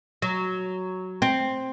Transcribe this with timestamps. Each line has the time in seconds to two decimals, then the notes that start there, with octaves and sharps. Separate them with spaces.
0.22 F#3
1.22 C4